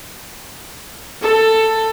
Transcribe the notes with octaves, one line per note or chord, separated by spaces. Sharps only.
A4